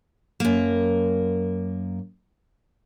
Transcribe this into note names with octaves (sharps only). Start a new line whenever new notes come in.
F#2 A#3